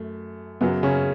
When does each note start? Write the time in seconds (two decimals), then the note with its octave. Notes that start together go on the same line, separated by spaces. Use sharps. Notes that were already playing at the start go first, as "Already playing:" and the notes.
Already playing: F#2 A3
0.61 F#2 C#3 F#3 B3
0.83 C#3 C#4